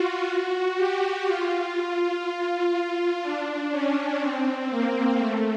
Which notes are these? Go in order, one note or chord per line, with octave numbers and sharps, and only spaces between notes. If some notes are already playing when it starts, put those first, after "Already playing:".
Already playing: F4 F#4
F#4
G4
F4
D4
C#4
C4
A#3
A3